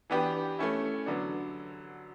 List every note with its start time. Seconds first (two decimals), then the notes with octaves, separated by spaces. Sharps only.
0.10 E3 B3 D4 G4 B4
0.59 A3 C#4 E4
1.06 D3 F#3 B3 D4